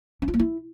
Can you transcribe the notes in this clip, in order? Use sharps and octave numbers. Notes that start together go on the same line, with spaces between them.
C#4
F4
A#3
E4